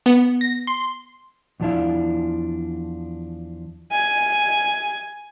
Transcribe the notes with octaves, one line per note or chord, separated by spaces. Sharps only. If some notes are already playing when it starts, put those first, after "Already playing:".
B3
A#6
C6
E2 A2 F3 D4 E4 F5
G#5